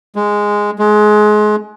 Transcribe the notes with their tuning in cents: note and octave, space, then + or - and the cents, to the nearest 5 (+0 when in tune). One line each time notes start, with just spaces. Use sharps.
G#3 -5
G#3 +25